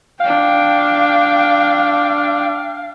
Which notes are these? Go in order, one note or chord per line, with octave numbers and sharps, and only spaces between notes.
D4 F5 G5